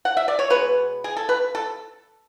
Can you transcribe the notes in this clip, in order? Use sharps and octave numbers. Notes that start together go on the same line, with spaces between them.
F#5
E5
D5
C#5
B2 G#3 B3 B4
G#4
A4
B4
A4